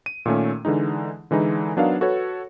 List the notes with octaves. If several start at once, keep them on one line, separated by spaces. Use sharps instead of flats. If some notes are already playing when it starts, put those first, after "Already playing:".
D#7
A#2 D#3 A3 C#4
D3 E3 G#3 D#4
D3 E3 G#3 D#4 E4
F#3 B3 D4 D#4 A#4 F5
F#4 A4 B4 C#5